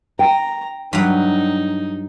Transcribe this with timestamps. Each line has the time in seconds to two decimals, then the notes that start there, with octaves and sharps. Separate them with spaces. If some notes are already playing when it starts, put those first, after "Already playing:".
0.19 G5 A#5
0.93 G2 F#3 D#4